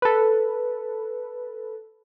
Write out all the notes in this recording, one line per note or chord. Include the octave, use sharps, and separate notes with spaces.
A4 B4